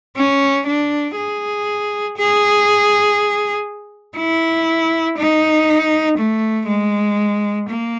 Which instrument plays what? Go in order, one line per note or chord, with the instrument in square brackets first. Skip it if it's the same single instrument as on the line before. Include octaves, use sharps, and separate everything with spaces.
[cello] C#4
D4
G#4
G#4
E4
D#4
A3
G#3
A#3